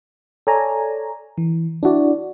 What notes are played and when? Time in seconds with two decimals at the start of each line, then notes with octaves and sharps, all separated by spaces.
0.47 A4 C#5 D5 G#5 A#5
1.38 E3
1.83 D4 E4 F#4 D5